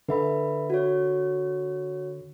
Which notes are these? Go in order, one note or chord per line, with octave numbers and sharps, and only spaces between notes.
D3 B4 E5 B5
F#4 C#5